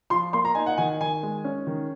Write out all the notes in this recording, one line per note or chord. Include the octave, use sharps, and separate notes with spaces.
F3 C6
A#3 C6
A#5
D#4 G#5
F#5
D#3 G#5
D#3 G#5
G#3
C#4
D#3